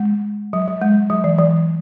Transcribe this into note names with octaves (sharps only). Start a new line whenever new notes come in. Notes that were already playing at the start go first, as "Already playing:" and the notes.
Already playing: G#3
F#3
F#3
G#3
F#3
E3
E3